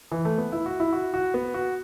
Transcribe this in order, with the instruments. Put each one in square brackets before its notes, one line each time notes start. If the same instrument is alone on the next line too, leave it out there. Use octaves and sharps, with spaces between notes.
[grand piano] E3
A3
B3
E4
F#4
E4
F#4
F#4
B3
F#4